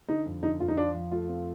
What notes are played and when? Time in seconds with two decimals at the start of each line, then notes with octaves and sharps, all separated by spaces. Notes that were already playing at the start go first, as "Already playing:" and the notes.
0.08 D3 D#4
0.26 F2
0.43 D3 D#4
0.60 F2 F4
0.68 D#4
0.77 F3 D4
0.94 F3
1.11 A3 F4
1.29 C4